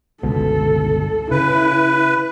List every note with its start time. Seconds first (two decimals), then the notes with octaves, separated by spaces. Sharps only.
0.23 G1 C#2 B2 A4
1.31 C#3 E4 B4